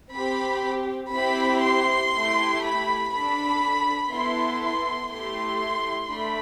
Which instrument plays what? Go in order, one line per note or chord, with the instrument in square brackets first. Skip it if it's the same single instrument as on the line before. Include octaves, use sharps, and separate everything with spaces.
[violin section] C4 G4 B5
C4 E4 G4 B5
C6
A3 E4 G4
B5
D4 A4 B5
B3 E4 A4 C6
C6
A3 E4 G4 C6
A3 D4 B5